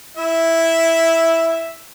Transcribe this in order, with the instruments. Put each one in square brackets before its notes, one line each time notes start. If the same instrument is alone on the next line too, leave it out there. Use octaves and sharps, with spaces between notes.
[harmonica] E4 E5